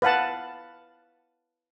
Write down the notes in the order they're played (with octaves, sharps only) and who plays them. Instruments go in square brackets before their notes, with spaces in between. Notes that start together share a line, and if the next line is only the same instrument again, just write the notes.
[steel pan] B4 F5 F#5 A5